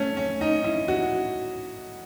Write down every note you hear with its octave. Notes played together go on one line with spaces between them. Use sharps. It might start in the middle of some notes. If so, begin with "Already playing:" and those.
Already playing: A3 C#4
C#4
D#4
E4
F#4